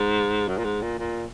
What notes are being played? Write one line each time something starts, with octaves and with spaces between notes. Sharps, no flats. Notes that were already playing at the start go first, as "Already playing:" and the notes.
Already playing: G#2
F#2
A#2
G#2
A#2
A#2